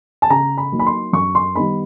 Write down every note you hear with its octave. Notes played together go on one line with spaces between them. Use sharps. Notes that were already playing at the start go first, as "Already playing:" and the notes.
A5
C#3 A#5
B5
F#3 A#3 D#4
B5
C6
F#2 C#6
C6
D#3 G3 B3 D#4 B5